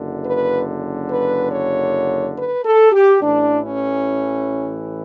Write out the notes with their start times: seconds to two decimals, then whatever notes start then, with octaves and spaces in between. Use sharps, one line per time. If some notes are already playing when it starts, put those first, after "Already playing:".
Already playing: F#1 F#2 D3
0.25 B4
1.09 B4
1.52 C#5
2.36 B4
2.64 A4
2.92 G4
3.20 A1 A2 E3 D4
3.62 C#4